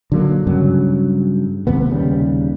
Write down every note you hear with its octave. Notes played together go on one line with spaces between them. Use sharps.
D3 F#3 A#3
G2 C#3 F#3
G#1 D#2 C3 B3
D#2 C#3 G3